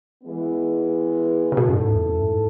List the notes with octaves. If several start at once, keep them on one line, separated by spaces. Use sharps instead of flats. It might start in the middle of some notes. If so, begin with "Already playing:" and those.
E3 G#3 B3
C#3
B2 E3 A3 E4 A4
F#2
G#2
E2
F#2
G#2